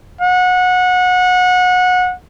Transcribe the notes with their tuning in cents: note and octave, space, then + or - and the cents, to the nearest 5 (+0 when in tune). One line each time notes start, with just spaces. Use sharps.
F#5 -25